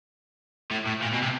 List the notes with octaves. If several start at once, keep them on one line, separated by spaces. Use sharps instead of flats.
A2
A2
A#2
B2
C3